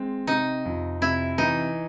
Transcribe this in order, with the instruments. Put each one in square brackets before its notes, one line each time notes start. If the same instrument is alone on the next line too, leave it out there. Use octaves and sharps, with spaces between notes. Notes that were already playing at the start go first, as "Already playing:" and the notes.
Already playing: [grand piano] G#3 C4
[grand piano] C3 [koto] D#4
[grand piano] F2
[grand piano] C3 [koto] E4
[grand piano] E3 [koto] D#4